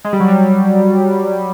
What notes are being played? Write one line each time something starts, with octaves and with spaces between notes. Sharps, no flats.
G#3
G3
F#3
G3